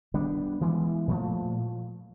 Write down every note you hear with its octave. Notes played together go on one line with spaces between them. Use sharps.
D#3 G3 B3 D4
E3 G#3 B3
A#2 F3 A3